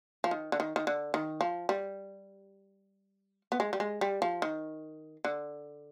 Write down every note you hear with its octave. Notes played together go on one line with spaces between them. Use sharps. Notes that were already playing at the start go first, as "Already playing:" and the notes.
F3
D#3
D3
D#3
D#3
D3
D#3
F3
G3
B3
G#3
G3
G#3
G3
F3
D#3
D3